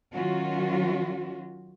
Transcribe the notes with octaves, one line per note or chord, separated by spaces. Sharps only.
D#3 F#3 C#4 F4 F#4